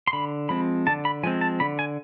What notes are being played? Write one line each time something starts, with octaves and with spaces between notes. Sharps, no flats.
C6
D3 B5
F3 G#3 C4 B5
D3 A5
B5
F3 G#3 C4 G#5
A5
D3 B5
G#5